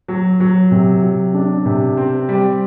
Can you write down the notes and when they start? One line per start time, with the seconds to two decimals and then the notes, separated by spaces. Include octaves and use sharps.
0.08 F#3
0.40 F#3
0.71 C3
1.02 F#3
1.34 D4
1.65 C3
1.97 C4
2.29 G3